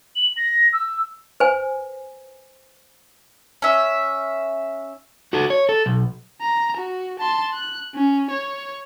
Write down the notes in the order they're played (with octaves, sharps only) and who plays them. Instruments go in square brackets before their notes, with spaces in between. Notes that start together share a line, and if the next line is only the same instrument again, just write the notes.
[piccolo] F#7
A#6
E6
[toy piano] B4 C5 G#5
[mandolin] C#4 E5
[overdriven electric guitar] F#4 A4
C#5
A4
B1
[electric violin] A#5
F#4
A5 C6
F#6
C#4
C#5